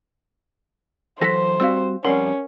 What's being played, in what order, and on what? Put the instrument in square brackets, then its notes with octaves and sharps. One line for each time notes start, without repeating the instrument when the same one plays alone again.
[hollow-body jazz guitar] E3 F#3 A4 [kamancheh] C5 [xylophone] A#6 B6
[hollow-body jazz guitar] G3 C4 F#4 [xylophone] F5 E6
[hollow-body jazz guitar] F2 G3 C6 [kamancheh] C#4 [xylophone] A#4 F#5